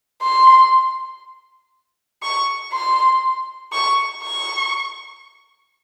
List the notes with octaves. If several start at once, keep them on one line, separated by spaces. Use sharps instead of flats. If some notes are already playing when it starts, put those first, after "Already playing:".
C6
C#6
C6
C#6
C#6